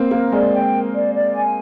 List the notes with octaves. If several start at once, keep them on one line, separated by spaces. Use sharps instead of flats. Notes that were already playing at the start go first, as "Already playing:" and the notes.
Already playing: A#3 C4
A#3 A#4
G#3 D5
G5
A#4
D5
D5
G#5